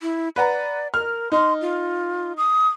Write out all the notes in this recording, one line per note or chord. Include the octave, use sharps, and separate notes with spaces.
E4
B4 D5 F#5 A#5
A#4 F6
D#4 C6
F4
D#6